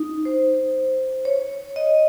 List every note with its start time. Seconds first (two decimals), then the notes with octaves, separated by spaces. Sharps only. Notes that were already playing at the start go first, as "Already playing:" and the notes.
Already playing: D#4
0.25 C5
1.25 C#5
1.76 D#5